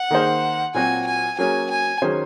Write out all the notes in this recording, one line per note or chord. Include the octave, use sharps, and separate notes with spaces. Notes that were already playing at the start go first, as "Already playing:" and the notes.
Already playing: F#5
D#3 A#3 D#4 G#4 C5
A#2 F#3 C4 F#4 G#5
G#5
F#3 A#3 C#4 G#4 G#5
G#5
D#3 F#3 C#4 G#4 C5